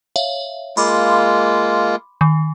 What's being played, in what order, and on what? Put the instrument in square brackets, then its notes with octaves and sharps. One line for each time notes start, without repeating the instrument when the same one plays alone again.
[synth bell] C#5 E5 F5
[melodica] G#3 A#3 F4 [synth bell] B5 C6 D6
[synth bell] D#3